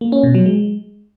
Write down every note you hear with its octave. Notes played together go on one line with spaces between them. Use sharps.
A#3
C#4
B2
F#3
G#3